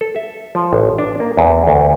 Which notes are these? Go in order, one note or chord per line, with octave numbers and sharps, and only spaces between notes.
A4
E5
F3
A1
D4
A#3
E2
D2